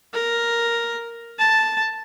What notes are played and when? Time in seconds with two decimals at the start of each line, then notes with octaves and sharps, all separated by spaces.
0.13 A#4
1.39 A5